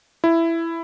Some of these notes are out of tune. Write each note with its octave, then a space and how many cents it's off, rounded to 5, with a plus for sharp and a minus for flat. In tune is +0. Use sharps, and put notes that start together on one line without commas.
E4 +10